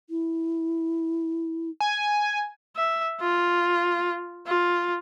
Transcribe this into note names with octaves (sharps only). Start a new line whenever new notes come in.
E4
G#5
E5
F4
F4